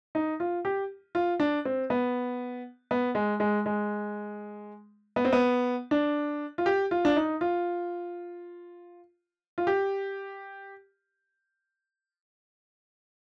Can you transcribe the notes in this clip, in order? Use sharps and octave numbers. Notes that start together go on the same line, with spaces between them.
D#4
F4
G4
F4
D4
C4
B3
B3
G#3
G#3
G#3
B3
C4
B3
D4
F4
G4
F4
D4
D#4
F4
F4
G4